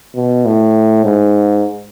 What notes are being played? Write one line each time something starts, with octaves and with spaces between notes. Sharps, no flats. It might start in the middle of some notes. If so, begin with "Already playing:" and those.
B2
A2
G#2